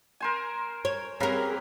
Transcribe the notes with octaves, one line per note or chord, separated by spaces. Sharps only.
A#4 C5 G#5
C#5
C4 C#4 G4 G#4 A#4 B4 F5 A#5